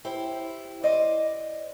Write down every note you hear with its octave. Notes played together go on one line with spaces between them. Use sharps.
E4 G4 C5
C5 D5 D#5